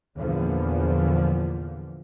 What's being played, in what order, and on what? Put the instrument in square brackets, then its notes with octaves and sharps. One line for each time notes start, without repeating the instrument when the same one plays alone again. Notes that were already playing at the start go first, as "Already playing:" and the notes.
[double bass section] E2 A#2 D3 E3 F3